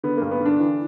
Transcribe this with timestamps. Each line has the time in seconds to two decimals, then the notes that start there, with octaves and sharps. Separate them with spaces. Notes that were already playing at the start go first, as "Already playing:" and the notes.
0.04 D3 B3
0.17 G2 A#3
0.31 B3
0.40 D3
0.45 D4
0.59 E3